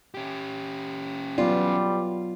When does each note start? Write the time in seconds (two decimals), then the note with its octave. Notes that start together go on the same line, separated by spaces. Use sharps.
0.15 C#4 G4
1.38 F#3 G3 B3 F4 D5